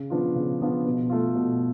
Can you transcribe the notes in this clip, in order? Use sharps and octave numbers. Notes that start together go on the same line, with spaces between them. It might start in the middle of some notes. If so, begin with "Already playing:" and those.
Already playing: C#3
F3 B3 D4 F4
C#3
F3 B3 D4 F4
B2
A3 F4
B2